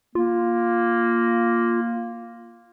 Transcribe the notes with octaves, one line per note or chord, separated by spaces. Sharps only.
A#3 F4